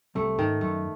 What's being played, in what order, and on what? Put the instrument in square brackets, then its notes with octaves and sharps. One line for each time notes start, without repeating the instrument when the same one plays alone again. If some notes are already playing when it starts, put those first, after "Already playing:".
[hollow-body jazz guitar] C2 C3 [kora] A3
[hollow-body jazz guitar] G#2 [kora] D#3
[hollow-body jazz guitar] F#2 [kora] A3